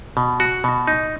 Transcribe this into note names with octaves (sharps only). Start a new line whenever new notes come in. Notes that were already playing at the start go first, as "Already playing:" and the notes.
B2
F#4
B2
D#4